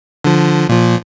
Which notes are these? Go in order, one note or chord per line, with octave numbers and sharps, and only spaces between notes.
D3 F3
A#2 F3